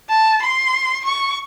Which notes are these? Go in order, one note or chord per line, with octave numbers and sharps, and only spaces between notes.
A5
C6
C#6